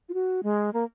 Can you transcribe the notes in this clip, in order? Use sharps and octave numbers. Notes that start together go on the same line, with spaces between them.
F4
F#4
G#3
A#3